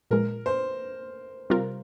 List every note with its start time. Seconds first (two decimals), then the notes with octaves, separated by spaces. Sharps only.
0.11 A#2 F3 G#3 A#4
0.46 C5
1.50 C3 G3 C4 F4 A#4